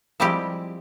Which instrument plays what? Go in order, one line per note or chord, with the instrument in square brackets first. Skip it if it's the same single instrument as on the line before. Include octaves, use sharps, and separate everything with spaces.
[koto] F3 G3 G#3 C4 E4 G4